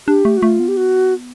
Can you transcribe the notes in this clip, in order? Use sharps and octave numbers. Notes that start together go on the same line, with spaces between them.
D4 G4
A3
F#4
A3 F4
B3
G4
F#4